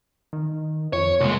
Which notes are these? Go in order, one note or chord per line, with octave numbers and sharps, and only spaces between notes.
D#3
F2 C#5
C2 A#2 G#3